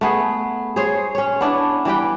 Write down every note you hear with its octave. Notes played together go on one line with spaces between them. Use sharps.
A3 B3 G#4
G#4 C5 C#5
C#4 C#5
B3 D4 E4
E3 G3 B4 G5